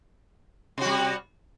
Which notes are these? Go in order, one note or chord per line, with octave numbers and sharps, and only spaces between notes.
C3 G3 F#4